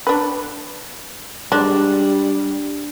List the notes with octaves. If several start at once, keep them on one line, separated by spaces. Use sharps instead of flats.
D4 B4
G3 G#3 D4